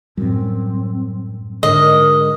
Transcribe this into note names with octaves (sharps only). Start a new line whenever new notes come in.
F#2 A2 G3 C4
G#2 D3 A#4 D#5